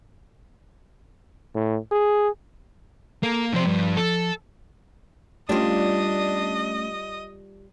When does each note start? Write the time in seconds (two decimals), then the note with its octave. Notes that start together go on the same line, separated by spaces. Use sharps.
1.55 A2
1.92 G#4
3.23 A#3 A4
3.54 C3 F3 C5 D5 C6
3.66 G2
3.97 A4
5.49 G3 A3 C#4 D4 F4 D#5